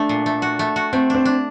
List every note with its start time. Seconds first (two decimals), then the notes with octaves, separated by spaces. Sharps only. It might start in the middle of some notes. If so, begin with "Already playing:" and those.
Already playing: A3 D4
0.09 A#2
0.26 A3
0.42 F#4
0.59 A3
0.76 F#4
0.93 A3 C4
1.10 C4 D4
1.25 D4